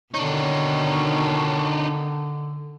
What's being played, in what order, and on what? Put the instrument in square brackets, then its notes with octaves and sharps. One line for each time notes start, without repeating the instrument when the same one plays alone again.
[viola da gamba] B2 D#3 [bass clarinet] D3 [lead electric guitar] D4 D#4 [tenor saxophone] C#5